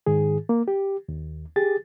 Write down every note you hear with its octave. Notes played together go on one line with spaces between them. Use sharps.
G#2 D#3 G#4
A#3
G4
D#2
G4 G#4 A6